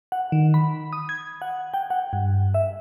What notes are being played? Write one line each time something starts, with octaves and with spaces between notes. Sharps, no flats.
F#5
D#3
B5
D#6
G#6
F#5
G5
F#5
G2
E5